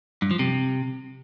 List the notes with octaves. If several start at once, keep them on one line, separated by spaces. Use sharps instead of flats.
G2
F3
C3